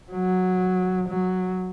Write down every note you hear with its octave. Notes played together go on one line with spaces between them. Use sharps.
F#3
F#3